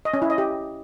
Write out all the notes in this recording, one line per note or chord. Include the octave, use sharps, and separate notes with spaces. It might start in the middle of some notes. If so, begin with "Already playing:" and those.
D#5
C#4
E4
D#5
G4